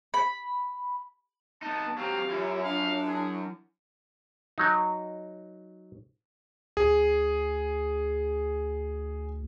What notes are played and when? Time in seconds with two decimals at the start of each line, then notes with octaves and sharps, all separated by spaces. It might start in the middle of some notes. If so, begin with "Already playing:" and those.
0.14 B5
1.63 B3 D#4 A5
1.98 F#3 C4 G4 F5
2.29 F#2 C#4 E4 F4 C#5
2.63 D4 F5
3.07 E4 G#4
4.58 F#3 D#4
6.77 D2 G#4